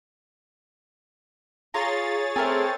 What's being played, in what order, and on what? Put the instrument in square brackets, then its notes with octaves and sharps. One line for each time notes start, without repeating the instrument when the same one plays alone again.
[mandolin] F4 A#5 [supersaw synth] G#4 C#5 A6
[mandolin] A3 A#4 G#5 [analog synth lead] C4